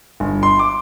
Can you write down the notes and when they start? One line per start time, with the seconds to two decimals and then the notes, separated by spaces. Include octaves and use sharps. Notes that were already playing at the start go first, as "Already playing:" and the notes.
0.20 G1
0.43 C6
0.59 D6